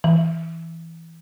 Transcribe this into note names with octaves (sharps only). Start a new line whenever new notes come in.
E3